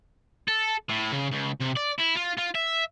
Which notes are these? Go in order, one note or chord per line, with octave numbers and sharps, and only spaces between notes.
A4
A2
C#3
C#2
C3
D5
E4
F4
F4
E5